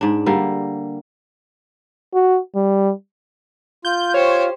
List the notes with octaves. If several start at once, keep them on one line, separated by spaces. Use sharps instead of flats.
G#2 D4
D3 G3 A#3
F#4
G3
F4 G6
G4 C5 C#5